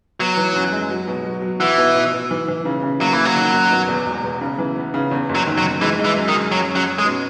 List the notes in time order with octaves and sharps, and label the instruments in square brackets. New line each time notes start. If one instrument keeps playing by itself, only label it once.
[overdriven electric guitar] F#3 [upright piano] B3
[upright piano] E3
F#2
G#3
F#3
B2
F#3
F#3
[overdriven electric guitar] E3 [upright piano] F#4
[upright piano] B2
B2
B2
E3
E3
C#3
C#3
[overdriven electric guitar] F#3 [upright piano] A#3
[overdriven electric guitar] E3
[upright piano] A#3
[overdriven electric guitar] F#3
[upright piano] D#3
F#1
B2
E2
E1
E2
C#3
E3
B3
C#3
E2
F#1
[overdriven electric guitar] F#3
[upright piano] D#3
[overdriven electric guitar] F#3
[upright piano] D#3
[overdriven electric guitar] E3 [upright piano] G#3
[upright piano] G#3
[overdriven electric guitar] E3
[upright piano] F#2
[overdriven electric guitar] D#3
[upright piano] F#2
[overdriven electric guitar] F#3 [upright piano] C#4
[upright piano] C#4
[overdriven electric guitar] F#3
[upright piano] C#4
[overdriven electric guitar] G#3
[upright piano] B2